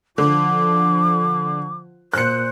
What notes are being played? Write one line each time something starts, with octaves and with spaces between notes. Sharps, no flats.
D3 F3 D6
A#2 C5 F#6 C#7